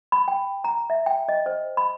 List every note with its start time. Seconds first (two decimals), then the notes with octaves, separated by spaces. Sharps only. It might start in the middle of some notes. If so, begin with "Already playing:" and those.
0.12 B5
0.28 G5
0.64 A#5
0.90 E5
1.06 G5
1.29 D#5
1.46 C5
1.77 B5